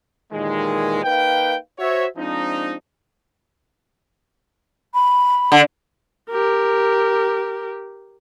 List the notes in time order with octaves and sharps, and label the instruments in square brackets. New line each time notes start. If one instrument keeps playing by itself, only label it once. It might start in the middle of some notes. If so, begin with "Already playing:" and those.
[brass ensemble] D#2 A#2 D#3 E3 G#3
A#3 D#4 B4 F5 G5
F#4 C5 C#5 E5
F3 G#3 C4 D4 D#4
[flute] B5
[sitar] D3
[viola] G4 A#4